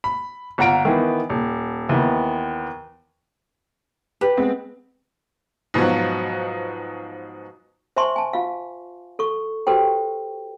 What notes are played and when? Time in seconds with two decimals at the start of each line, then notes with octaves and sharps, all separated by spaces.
0.04 B5
0.58 G1 F4 F#5 A#5 D7
0.85 D#3 E3 B3
1.30 D#1
1.89 D#2 E3 B3
4.21 G4 B4
4.37 G#3 B3 C4
5.74 G#2 B2 F3 F#3
7.97 C5 E5 G#5 A5 C6 C#6
8.16 G#5 A5
8.33 F4 F5
9.19 A4 C#6
9.67 F#4 G4 A4 B4 C5 G5